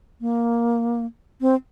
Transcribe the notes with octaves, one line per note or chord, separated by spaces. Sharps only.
A#3
C4